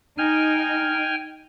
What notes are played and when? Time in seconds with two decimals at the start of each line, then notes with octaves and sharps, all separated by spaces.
0.18 D#4 G5 G#5 F6